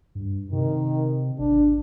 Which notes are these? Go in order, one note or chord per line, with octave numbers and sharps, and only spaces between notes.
G2
C3 D#3
G#1 D4